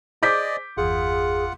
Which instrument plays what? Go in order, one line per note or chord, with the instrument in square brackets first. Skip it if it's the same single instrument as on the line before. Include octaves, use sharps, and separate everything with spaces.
[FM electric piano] G#4 C5 A#6 [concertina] D5 D#5 [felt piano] D6 G6 B6
[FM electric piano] G1 E2 [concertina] F4 F#5 [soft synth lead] G#4